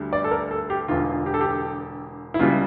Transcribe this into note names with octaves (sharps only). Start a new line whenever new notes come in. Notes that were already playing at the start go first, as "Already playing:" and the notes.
Already playing: D2 D3 G3
D5
A4
A#4
A4
G4
E1 E2 D3 F4
G4
A4
G4
E4
C#2 C#3 G3 F4